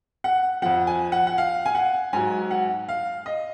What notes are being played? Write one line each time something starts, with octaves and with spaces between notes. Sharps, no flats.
F#5
F2 F3 F#5
G#5
F#5
F#5
F5
G#5
F#5
G#2 F#3 G#5
F#5
F5
D#5